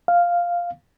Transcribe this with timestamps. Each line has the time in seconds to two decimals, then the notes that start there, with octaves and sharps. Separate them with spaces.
0.08 F5